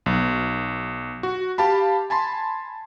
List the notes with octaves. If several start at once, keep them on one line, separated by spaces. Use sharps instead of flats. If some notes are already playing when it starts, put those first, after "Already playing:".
B1
F#4
G4 F5 A5 B5
G#5 A5 B5 C6